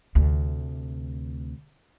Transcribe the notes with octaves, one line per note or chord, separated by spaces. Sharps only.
D2 C3